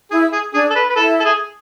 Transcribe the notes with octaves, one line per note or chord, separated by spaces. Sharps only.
E4 G#4
G#4
D4 G#4
A4
B4
B4
E4 A4
A4
G#4